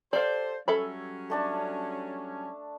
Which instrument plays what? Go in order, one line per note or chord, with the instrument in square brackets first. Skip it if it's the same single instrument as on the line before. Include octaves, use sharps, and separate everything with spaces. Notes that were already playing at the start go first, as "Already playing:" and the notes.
[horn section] G4 A4 C5 [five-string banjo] D5 F5
[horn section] F#3 G3 C#4 [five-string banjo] A4 E5 B5
[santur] A3 D4 A5